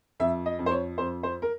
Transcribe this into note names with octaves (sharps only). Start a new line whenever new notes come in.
F2 E5
D#5
F2
C5
C#5
F2 C5
C5
A#4